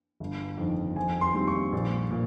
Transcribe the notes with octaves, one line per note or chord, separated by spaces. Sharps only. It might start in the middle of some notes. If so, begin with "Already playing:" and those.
G1
F2 D#3
F2 G#5
C6
D#3 G3 C4
C#6
A#1
A#2